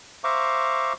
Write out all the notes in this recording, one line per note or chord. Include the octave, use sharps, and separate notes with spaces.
C5 E5 F5 A#5 C#6 D6